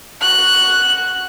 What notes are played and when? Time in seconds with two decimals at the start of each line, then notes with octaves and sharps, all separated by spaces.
0.21 F#4 F#6